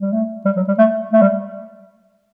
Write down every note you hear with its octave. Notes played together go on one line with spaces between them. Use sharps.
G3
A3
G3
F#3
G3
A3
A3
G3